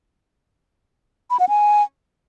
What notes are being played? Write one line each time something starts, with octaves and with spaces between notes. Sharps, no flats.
B5
F#5
G#5